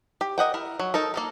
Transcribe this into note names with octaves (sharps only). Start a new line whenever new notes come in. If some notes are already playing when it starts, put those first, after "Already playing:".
G4
A#4 D#5 F#5 G5
E4 A#4
F#3
D#4 A4 A#4
A#3 A4 A#4